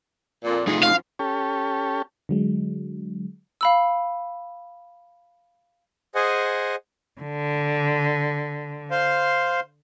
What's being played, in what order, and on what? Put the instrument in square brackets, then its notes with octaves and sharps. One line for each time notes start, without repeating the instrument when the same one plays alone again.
[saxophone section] F2 A#2
[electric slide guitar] A3 D#4 F4 [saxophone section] G#4
[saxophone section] F#2 F3 [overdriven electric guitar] F5
[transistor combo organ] C#4 G4 A4
[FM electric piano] D3 F#3 G#3
[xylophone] F5 B5 E6
[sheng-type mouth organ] G#4 C5 D#5 F#5 G#5
[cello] D3
[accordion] C5 F5 C6